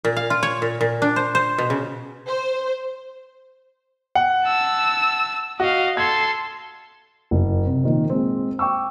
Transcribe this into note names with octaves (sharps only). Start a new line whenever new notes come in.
A#2
F5
F4
C#5
A#2
A#2
D4
C5
C5
B2
C#3
C5
F#5
A5 E6
F#4 D#5 F5
A4 C6 G#6
F#1
C3
A#2 D#3 F3 C4
G#3 A#3 C4
G5 C#6 D6 E6